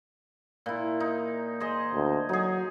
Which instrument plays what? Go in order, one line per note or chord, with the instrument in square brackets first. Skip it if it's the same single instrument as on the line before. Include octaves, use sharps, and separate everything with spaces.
[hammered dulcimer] A#2 E4
D#4
G#4 C5 D#5
[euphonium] D2
[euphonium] F#3 [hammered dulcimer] D#4 G#4